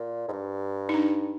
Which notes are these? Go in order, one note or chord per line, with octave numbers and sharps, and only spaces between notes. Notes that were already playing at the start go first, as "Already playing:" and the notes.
Already playing: A#2
G#2
G2
D#4
D4